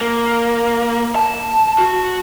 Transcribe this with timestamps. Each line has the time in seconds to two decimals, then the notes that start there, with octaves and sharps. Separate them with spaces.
0.01 A#3
1.16 A5
1.78 F#4